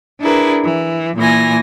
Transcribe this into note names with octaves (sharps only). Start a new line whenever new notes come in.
D4 E4 G#4 A#4 B4
E3
A#2 E3 G#5 A#6